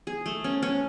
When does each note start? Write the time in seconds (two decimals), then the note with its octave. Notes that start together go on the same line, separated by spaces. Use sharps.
0.07 G#4
0.26 A3
0.44 C#4
0.63 C#4